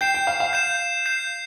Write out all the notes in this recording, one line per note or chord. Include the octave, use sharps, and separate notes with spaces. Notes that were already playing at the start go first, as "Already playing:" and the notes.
G5 G6 C7 E7
G5
F5
F5
G6 C7 E7
G6 C7 E7